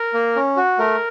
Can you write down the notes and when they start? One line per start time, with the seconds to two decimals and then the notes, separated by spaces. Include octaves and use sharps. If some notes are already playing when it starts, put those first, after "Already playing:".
Already playing: A#4
0.14 A#3
0.36 C#4
0.57 F#4
0.79 A3 A#4